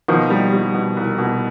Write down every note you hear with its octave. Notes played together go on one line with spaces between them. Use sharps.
B2 D#3 F3
G3
G3
B2
C2
B2